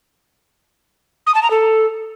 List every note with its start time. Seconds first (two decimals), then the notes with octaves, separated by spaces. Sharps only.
1.27 D#6
1.35 A5
1.43 A#5
1.51 A4